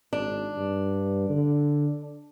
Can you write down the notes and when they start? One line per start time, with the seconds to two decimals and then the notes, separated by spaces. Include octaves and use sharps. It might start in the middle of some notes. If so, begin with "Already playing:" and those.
0.13 G#1 D4
0.56 G2
1.30 D3